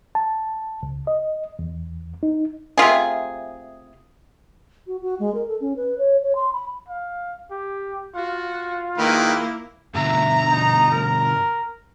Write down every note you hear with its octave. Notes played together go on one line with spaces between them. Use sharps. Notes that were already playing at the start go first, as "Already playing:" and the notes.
A5
C#2
D#5
E2
D#4
C3 A3 F4 G#4
F#4
F#4
G#3
A#4
A4
C#4
B4
C#5
C#5
C6
B5
F5
G4
F4 F#4
D#3 G#3 A#3 E4 B4
G2 B2 D3 E5 A#5
D#4
A#4